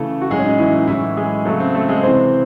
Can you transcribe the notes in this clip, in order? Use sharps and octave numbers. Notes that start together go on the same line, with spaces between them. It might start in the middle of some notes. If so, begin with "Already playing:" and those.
Already playing: C#3 E3 A3 A4
F#4
A2 F#3 G#3 G#4
C#4
D#4
E3 E4
D#4
A2 E3 F#3 E4
G#3 G#4
C#3 F#3 A3 A4
C4 C5
A3 A4
G#3 G#4
C3 E3 C4 C5